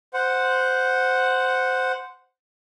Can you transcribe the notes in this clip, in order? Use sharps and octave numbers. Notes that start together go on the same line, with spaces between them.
C5 F#5